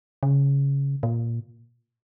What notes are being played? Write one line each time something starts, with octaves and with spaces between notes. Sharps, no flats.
C#3
A#2